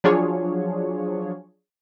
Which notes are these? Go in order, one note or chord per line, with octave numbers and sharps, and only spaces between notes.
F3 F#3 D4 F4 G#4 C#5